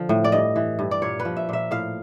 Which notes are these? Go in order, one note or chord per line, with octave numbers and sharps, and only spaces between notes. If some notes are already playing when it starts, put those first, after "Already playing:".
Already playing: D3 F3
A2
D5
G2 D#5
E3
G2
D5
A#2 C#5
B4
F3
E5
A#2 E5
A2 F5